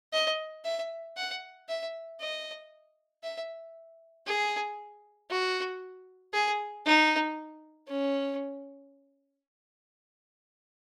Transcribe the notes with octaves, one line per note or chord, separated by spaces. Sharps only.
D#5
E5
F#5
E5
D#5
E5
G#4
F#4
G#4
D#4
C#4